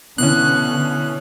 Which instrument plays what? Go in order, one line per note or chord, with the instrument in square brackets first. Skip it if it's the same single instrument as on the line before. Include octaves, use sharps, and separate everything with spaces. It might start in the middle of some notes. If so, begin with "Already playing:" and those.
[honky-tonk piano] B2 E3 C#4 [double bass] D3 [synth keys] F#6